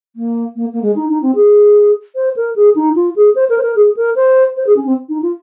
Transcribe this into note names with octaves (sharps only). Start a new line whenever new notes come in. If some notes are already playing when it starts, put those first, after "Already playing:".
A#3
A#3
A#3
G#3
D#4
D#4
C4
G#4
C5
A#4
G#4
D#4
F4
G#4
C5
A#4
C5
A#4
G#4
A#4
C5
C5
G#4
C#4
C4
D#4
F4